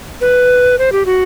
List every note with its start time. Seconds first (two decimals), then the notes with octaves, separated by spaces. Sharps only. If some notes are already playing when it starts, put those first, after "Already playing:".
0.21 B4
0.79 C5
0.92 G4
1.06 F#4